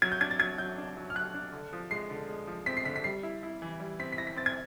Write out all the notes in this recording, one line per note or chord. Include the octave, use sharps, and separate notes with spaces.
F#3 G#6
G6
D4 G#6
A6
F#3 G#6
F#3 G6
D4
F#3
F6
F#3 F#6
D4
D3
F3
G#3 C7
D3
G#3
F3
C4 B6
C7
D3 B6
B6
G3 C7
E4
E4
E3
G3
C4 B6
B6
E4 A#6
B6
C4 A6
G#6